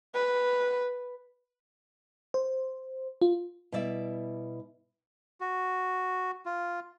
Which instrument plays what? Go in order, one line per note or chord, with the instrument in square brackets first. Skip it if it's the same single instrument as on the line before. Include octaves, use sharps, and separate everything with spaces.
[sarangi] B4
[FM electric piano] C5
F4
[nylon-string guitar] B2 G3 E4 D5 E5
[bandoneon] F#4
F4